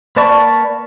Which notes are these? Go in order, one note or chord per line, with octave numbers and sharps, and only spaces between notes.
A#3 B4 D5 A5 C#6